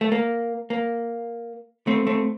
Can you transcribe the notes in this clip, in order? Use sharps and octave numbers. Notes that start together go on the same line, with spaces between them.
A3
A#3
A#3
A3 C4
A3 C4